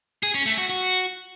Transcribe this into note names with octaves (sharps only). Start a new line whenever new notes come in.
G#4
C#4
A3
F#4
F#4